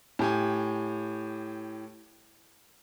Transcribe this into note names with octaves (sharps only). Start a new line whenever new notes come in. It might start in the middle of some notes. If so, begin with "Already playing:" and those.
A2 G4 G#5